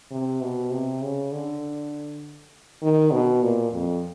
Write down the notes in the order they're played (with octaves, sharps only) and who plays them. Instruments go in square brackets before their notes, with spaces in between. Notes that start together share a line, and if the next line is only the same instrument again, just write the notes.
[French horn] C3
B2
C3
C#3
D3
D#3
B2
A#2
F2